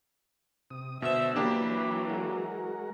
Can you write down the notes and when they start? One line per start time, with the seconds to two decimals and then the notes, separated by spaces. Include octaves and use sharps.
0.70 C3 D#6
1.02 B2 D3 C5 E5 E7
1.36 E3 F#3 A#3 D4 G4 B5
2.10 G#3 F#4 A#4